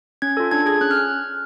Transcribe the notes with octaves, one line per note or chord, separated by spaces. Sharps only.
C#4 G#6
F4 A4
D4 G#6
G#4 G#6
C#4 F#6
F6